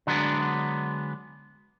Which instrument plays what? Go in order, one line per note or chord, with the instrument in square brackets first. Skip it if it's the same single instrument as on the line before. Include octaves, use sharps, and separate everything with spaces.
[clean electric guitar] D3 F#3 G#3 B3 D4